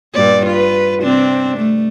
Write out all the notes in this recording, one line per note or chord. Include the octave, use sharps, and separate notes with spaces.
G2 A#2 D5
F4 B4
C3 C4 D4
A3